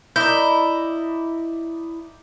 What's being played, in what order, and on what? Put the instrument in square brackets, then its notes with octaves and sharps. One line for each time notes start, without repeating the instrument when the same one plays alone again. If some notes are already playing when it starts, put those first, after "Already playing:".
[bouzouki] E4 [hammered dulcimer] D5 D#5 A#5 [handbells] G6